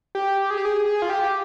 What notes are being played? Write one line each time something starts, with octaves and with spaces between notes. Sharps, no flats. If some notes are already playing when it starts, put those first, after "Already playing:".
G4
G#4
G4
G#4
G#4
F4
G4